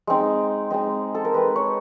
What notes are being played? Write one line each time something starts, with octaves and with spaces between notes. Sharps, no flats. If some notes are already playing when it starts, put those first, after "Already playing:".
G#3 C4 D#4
G#3 C4 D#4
A4
A#4
G#3 C4 D#4 B4
C#5